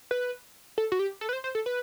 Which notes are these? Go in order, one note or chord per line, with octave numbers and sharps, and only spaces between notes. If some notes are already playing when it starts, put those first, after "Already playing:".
B4
A4
F#4
G4
A4
B4
C5
C5
A4
B4